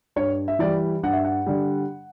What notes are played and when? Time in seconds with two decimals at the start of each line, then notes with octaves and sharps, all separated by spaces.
0.16 G2 C#5
0.48 E5
0.59 E3 G3 D5
1.03 G2 F#5
1.13 E5
1.25 F#5
1.46 D3 G3